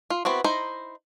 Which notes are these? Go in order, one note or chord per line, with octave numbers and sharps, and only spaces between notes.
F4
B3 C4 E4 F#4
D#4 E4 C5 A#5